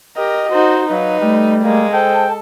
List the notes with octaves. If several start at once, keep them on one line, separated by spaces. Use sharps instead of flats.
G4 A#4 D#5
D#4 F#4 C5
F#3 D#4 B4 F5
G3 A3
G#3 A#3
A4 C5 G5 A5